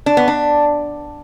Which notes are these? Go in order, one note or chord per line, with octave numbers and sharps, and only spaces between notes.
D4
B3
D4